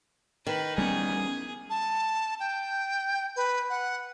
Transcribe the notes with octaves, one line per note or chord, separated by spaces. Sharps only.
D#3 B4
G3 B3 C#4 G#4
A5
G5
B4
F#5